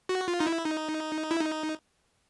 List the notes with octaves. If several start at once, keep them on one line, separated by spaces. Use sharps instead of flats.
F#4
F4
D#4
E4
D#4
E4
D#4